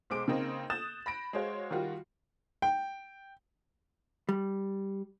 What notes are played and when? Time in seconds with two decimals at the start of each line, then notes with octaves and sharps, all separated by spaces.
0.10 B1 G#3 C5 D6 D7
0.28 C#3 A#3 C4 D#4
0.70 D#6 F#6 G6 A6 E7
1.06 B5 A#6 D7
1.33 G#3 F#4 C5 C#5 F5
1.71 D#3 G3 F4 F#4
2.62 G5
4.29 G3